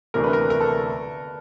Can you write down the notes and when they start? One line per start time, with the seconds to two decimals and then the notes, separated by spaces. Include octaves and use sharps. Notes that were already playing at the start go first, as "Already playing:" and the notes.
0.14 D2 C3 E3 A3 D4 A#4
0.24 B4
0.33 A#4
0.50 A#4
0.61 A4